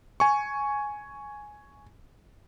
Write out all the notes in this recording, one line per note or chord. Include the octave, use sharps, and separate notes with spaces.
G#5 C#6